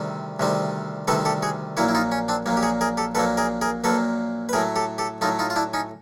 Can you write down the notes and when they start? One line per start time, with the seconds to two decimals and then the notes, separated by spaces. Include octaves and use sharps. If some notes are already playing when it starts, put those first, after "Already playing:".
Already playing: D2 C3 D#3 G3 C4
0.40 D2 C3 D#3 G3 C4
1.08 D2 C3 D#3 G3 C4 A4 B4
1.25 G4 A4
1.42 F#4 G#4
1.77 A#1 A#2 F#3 A#3 E4 F#4
1.89 E4
1.95 D#4 F4
2.12 C#4
2.28 C4 D4
2.46 A#1 A#2 F#3 A#3
2.57 G4
2.63 F#4 G#4
2.81 G#4 A#4
2.97 G4 A4
3.15 A#1 A#2 F#3 A#3 A4 B4
3.37 G#4 A#4
3.61 G#4 A#4
3.84 A#1 A#2 F#3 A#3 A4 B4
4.49 B4
4.53 A2 F#3 A3 G#4 A#4
4.76 G4 A4
4.98 G4 A4
5.21 A2 F#3 A3 D#4 F4
5.39 D#4 F4
5.50 F4
5.56 D4 E4
5.74 C#4 D#4